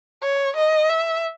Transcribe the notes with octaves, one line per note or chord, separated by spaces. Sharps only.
C#5
D#5
E5